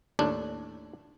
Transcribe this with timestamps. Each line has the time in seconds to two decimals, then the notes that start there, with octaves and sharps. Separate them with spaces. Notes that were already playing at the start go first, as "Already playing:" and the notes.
0.19 D#2 A2 D4